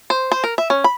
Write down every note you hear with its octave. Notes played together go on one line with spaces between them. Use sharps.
C5
C5
A#4
E5
C#4
B5